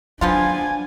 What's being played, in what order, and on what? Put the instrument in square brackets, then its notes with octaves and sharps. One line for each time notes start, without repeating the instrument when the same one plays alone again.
[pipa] F3 B3 F4 [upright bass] F#3 [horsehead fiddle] D4 G#5